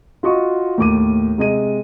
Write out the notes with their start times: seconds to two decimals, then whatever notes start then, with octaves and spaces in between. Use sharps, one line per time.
0.23 F4 F#4 D#5 C#6
0.78 D#2 A2 D6 D#7
1.38 C3 G#3 D#5 D#7